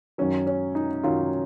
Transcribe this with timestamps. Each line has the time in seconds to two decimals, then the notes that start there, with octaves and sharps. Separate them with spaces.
0.18 F#2 D#3 F#3 C#4
0.47 C#4
0.75 D#4
1.03 F#2 D#3 F#3 F4